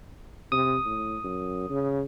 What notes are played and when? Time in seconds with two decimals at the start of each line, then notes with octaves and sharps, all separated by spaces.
0.52 C3 D#6
0.85 A2
1.24 F#2
1.69 C#3